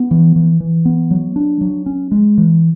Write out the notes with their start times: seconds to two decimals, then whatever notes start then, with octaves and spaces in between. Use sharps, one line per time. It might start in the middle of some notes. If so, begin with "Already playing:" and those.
Already playing: B3
0.11 E3
0.36 E3
0.60 E3
0.85 B3
1.11 F#3
1.36 D4
1.61 F#3
1.86 C#4
2.11 G#3
2.38 E3